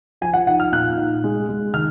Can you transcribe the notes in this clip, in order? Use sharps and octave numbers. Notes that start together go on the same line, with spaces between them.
F3 G#5
F#5
D#4 F#5
F6
A#2 F#6
D#4
G#3
G#3
D#3 F6